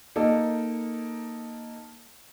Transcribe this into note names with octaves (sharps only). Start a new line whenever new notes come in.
A#3 D#4 A4